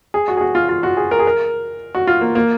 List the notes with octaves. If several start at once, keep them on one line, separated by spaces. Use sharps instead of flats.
G#4
F#4
G#4
F#4
F4
F4
F#4
G#4
A#4
G#4
A#4
F#4
F4
A#3
A#3